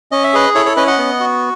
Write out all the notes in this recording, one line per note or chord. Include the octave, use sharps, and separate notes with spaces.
C#4 D#5
E5
G#4 B4 D#5
E4 A4 C#5
A4 C#5
C#4 B4 D#5
D#5 F#5
B3
F#4